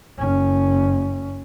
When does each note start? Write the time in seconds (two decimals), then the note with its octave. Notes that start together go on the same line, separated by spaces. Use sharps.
0.18 F#1 C#4